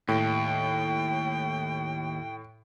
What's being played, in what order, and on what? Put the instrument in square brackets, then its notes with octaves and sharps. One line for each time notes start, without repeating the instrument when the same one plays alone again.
[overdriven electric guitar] D#2 [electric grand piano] A2 [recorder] G5